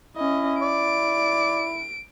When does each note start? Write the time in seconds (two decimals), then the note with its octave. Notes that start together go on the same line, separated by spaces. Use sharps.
0.17 C#4 E4 D#5
0.62 D5 D7